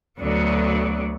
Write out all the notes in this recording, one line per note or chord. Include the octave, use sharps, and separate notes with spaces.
D2 D3 F#3 B3